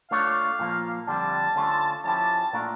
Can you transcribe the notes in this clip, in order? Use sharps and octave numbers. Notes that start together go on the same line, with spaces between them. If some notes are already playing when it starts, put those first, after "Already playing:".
A3 D4 F4 C#5 F5
A#2 F3 A#3
F2 D3 G3 D4 A5
D3 A3 C#4 F4
F3 C#4 E4 G4 A5
A#2 A3 D4 F4 A#4